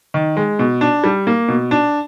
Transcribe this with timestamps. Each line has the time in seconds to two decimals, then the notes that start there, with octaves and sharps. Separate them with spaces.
0.14 D#3
0.37 G#3
0.59 B2
0.81 D4
1.04 G3
1.27 A#3
1.48 B2
1.71 D4